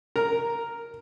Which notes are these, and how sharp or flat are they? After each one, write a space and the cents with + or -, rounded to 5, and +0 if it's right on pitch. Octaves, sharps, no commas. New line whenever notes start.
A#4 +0 A#5 +0